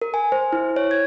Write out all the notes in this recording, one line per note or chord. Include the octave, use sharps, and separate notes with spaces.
A#4
G#5
C5
E4
C#5
G#6